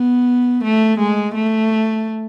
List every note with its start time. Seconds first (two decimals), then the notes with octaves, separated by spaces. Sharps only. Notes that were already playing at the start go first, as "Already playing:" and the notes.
Already playing: B3
0.63 A3
0.99 G#3
1.34 A3